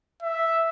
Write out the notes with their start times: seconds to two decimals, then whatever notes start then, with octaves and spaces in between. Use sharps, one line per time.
0.22 E5